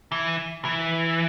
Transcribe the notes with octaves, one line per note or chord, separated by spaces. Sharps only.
E3
E3